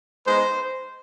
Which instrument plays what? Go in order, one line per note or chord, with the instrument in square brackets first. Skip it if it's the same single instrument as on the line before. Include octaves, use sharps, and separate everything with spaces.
[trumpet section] G#3 B3 D#4 C5